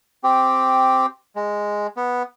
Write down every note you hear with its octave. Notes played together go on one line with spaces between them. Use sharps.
C4 G4
G#3
B3